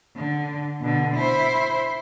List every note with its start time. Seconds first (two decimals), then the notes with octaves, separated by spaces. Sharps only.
0.16 D3
0.81 B2 D3
1.15 E4 C5